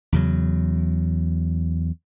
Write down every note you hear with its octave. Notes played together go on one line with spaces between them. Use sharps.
E2 C#3 F#3